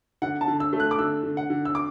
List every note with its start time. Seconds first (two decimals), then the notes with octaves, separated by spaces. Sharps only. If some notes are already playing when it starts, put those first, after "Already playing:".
0.22 D3 F#5
0.41 A5
0.48 D3
0.60 E6
0.73 A3
0.80 F#6
0.91 D6
0.99 D3 E6
1.23 D3
1.37 F#5
1.50 D3
1.65 E6
1.75 D6